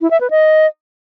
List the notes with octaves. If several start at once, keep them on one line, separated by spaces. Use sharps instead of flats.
E4
E5
B4
D#5